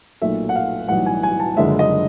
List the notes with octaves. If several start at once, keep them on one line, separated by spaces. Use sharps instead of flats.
B1 A#2 F#3 A3 E5
F#5
F5
B1 A2 E3 G3 F#5
G#5
G#5
A5
F#1 F#2 D3 F3 G#3 E5
D#5